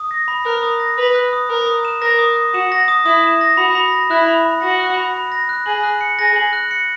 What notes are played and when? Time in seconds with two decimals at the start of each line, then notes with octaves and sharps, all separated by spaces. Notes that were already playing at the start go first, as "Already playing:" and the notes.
Already playing: D#6
0.11 A#6
0.28 B5
0.45 A#4 F#6
0.63 D#6
0.80 A#6
0.98 B4 B5
1.15 F#6
1.33 D#6
1.49 A#4 D#6
1.66 D#6
1.85 E7
2.02 A#4 A#6
2.19 D#6
2.36 D#6
2.54 F#4 E7
2.72 A#6
2.88 D#6
3.05 E4 D#6
3.24 E7
3.41 A#6
3.57 F#4 B5
3.75 B5
3.92 A#6
4.10 E4 F#6
4.28 B5
4.45 B5
4.62 F#4 A#6
4.80 F#6
4.97 B5
5.14 B5
5.32 A#6
5.49 F#6
5.66 G#4 F#7
5.83 F#6
6.01 C#7
6.19 G#4 A#6
6.36 F#7
6.53 F#6
6.71 C#7